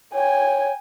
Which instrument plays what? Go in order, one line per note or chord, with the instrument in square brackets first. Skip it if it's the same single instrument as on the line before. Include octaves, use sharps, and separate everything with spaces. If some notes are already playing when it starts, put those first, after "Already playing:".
[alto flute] C#5 [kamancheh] G5 G#5